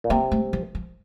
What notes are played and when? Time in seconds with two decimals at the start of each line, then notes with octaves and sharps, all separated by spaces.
0.04 A#2
0.10 C3 A#3
0.32 A3
0.53 F3
0.75 F3